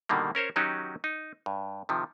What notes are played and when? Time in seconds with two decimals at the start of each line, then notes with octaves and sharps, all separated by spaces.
0.09 B2 D3 D#3 G3 A#3
0.35 C#4 A#4 C5 C#5
0.56 D#3 F#3 C#4 D#4 F#4 G4
1.04 D#4
1.46 G2
1.89 C3 D#3 F3